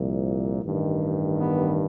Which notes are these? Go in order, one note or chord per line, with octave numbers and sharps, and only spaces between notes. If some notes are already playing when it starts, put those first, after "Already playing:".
Already playing: C2 A#2 F3
A1 G2 D#3
B3